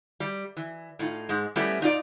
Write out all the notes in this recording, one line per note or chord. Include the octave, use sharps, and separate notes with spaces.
G3
E3
A2 D#4 F4
G#2 G#3
G3 A3 B3 C#4 E4 G4
A#2 D#4 F4 D5